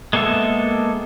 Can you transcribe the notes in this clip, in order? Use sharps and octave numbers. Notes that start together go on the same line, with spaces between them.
G#3 A#3 B3 A4 E5